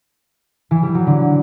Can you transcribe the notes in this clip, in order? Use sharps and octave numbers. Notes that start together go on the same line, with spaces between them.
E3
G3
F#3
D3